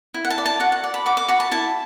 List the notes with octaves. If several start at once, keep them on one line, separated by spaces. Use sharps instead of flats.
E4
F#5
A5
D5
A5
F#4 F#5
F#5
D5
B5
F#4 D6
D6
F#4 B5
A5
E4 A5